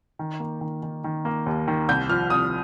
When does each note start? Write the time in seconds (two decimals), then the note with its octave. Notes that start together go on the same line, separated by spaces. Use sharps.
0.19 D#3
0.40 A#3
0.61 D#3
0.83 D#3
1.04 D#3
1.25 A#3
1.46 D#2
1.68 D#3
1.88 C2 G6
2.09 F3 F6
2.30 C2 D#6